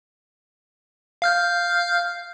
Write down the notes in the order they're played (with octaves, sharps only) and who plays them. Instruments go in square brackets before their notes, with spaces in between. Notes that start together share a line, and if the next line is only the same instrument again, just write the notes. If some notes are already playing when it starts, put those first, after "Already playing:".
[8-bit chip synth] F5 F6 G6